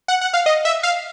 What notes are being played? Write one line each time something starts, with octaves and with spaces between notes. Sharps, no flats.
F#5
F#5
F5
D#5
E5
F5